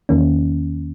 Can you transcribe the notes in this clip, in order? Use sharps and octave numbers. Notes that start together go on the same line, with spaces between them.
E2 D#3 A#3 C#4